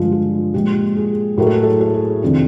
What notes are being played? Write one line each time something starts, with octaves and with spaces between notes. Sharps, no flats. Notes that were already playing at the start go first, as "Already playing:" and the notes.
Already playing: G2 D3 F3 G#3 F4
F4
A#2 F3 G#3 G4
G#4
A2 F#3 A3 A#4
A4
G#4
A4
A4
G#4
F2 C3 D#3 D4